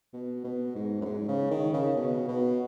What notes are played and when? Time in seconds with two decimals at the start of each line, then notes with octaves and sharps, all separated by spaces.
0.13 B2
0.44 B2
0.76 G#2
1.01 F#2
1.05 G#2
1.28 C#3
1.51 D#3
1.74 C#3
1.97 B2
2.28 B2